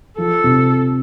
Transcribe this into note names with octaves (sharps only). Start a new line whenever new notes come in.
F3 A4
C3